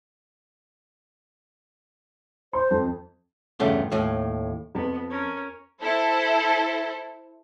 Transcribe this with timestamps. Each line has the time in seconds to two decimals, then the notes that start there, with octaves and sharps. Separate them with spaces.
2.53 C5 C6
2.71 F2
3.60 E2 G2 C#3 A3 F4
3.92 D#2 A2
4.75 F2 B3
5.10 C#4 A#4
5.81 E4 A4 C5